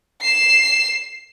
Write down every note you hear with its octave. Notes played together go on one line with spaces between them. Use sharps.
C7 E7